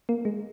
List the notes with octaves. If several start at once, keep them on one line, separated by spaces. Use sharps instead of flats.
A#3
G#3